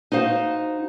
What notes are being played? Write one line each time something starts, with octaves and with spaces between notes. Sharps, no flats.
D#4 F#4 C5 F5